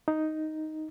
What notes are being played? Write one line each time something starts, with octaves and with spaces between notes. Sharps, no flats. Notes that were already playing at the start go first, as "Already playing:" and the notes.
D#4